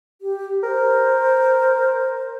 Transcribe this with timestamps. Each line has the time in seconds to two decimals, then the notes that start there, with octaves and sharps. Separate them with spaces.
0.22 G4
0.63 A#4 C5